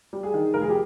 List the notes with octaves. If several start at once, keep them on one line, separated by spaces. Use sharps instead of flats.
G3
G#4
D#3
F1 A#4
G#4
G4